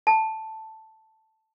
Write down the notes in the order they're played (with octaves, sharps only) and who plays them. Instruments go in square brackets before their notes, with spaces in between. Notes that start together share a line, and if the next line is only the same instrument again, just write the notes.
[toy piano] A5